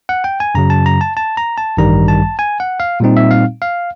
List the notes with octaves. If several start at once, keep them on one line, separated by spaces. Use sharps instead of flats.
F#5
G5
G#5
F#2 C#3 F#3 A#5
A5
A#5
A5
A5
A#5
A5
A1 G2 D#3 G3 A#5
A5
G#5
F#5
F5
A#2 G3 C4 D#4
E5
F5
F5